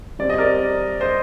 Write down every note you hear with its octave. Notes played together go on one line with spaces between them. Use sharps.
C3 G3 C4 D5
D#5
A#4 D5
C5 D#5